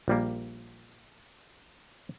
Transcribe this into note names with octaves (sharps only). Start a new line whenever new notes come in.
A#1 G3 A#3